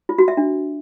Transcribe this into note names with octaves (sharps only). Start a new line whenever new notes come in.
F4
F#4
E5
D4